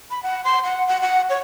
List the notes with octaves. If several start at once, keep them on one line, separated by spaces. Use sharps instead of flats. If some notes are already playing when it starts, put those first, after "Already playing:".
B5
F#5
C6
F#5
F#5
F#5
C#5